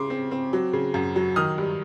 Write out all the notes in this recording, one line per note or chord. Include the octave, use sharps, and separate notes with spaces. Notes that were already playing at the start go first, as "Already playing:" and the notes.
Already playing: C#3 C6 D6
C4
C4
F#3
C#3
F#2
F#3
D#3 D#6 F6
G2